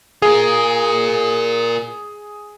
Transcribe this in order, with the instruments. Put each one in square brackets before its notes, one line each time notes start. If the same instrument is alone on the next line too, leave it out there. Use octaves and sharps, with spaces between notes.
[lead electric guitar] F4 A#4 [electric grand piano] G#4